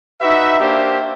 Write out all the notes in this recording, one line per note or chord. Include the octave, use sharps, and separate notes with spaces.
D#4 F#4 B4 E5
A#3 D4 G4 C5 E5